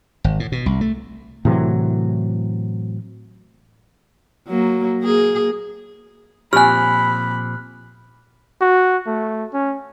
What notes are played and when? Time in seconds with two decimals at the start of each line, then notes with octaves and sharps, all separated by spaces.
0.24 G#1
0.40 A2
0.52 B2
0.66 C2
0.81 A3
1.45 A2 C3 E3 F#3
4.48 F#3 A#3
5.01 A#3 G#4
6.53 A#2 F3 C4 G4 G#5 B5 F6 F#6
8.61 F#4
9.07 A3
9.54 C#4